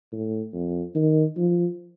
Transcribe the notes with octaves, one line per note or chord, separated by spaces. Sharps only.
A2
F2
D#3
F3